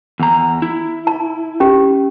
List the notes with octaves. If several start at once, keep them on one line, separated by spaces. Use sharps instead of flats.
E2 A#5
E4
A5
C#4 G4